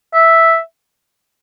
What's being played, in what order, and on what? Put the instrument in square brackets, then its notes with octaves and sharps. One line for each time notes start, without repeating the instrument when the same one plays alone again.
[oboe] E5